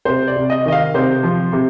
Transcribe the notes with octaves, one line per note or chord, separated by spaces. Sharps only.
C3 C5
D5
C3
D#5
D#3 D#5
F5
C3 C5
F3
C3